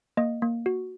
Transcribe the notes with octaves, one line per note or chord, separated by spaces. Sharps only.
A#3 D#5
A#3
F#4